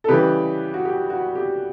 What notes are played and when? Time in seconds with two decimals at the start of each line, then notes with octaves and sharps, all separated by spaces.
0.04 A4
0.08 C#3 E3 G3 G4 B4
0.74 F#4
0.85 G4
1.10 F#4
1.35 G4